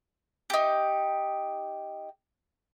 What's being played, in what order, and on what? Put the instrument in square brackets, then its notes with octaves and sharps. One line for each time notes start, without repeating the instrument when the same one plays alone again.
[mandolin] D#4 G4